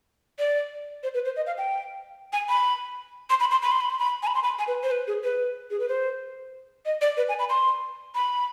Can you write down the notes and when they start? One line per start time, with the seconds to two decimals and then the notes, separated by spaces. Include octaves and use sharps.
0.39 D5
1.03 C5
1.14 B4
1.25 C5
1.36 D#5
1.46 F5
1.58 G5
2.33 G#5
2.49 B5
3.30 C6
3.40 B5
3.51 C6
3.62 B5
3.72 C6
3.81 B5
3.90 C6
3.99 B5
4.23 G#5
4.27 B5
4.35 C6
4.43 B5
4.59 G#5
4.67 B4
4.83 C5
4.91 B4
5.07 G#4
5.24 B4
5.71 G#4
5.80 B4
5.88 C5
6.86 D#5
7.01 D5
7.17 B4
7.29 G#5
7.39 B5
7.50 C6
8.15 B5